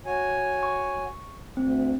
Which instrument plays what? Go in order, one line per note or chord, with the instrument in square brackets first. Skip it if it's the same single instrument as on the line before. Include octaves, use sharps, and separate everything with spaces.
[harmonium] F#4 C#5 G#5
[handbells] C#6
[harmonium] D2 [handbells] C4